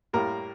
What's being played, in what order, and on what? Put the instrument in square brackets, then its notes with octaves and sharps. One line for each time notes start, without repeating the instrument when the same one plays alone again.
[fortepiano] A2 G3 A#3 A#4